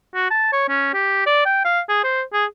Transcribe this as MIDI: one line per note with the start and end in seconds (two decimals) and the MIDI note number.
0.15 0.28 66
0.30 0.52 81
0.53 0.65 73
0.68 0.90 61
0.94 1.24 67
1.26 1.44 74
1.45 1.65 79
1.65 1.80 77
1.89 2.03 68
2.04 2.21 72
2.33 2.45 68